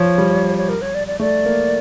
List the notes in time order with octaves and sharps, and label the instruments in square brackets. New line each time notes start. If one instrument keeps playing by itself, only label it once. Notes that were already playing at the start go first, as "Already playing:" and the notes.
Already playing: [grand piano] F3 [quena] C#5
[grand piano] G3
[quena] C#5
A#4
C#5
D5
D5
[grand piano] A3 [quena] D5
[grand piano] A#3